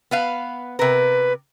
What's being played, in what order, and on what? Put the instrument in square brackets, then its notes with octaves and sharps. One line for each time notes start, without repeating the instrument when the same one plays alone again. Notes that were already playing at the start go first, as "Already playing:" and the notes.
[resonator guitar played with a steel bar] B3 B4 F5
[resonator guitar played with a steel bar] C3 A#4 [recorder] B4